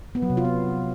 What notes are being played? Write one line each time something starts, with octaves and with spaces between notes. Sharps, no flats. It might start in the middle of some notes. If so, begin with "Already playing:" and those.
B3
F#3
C3
F4
B3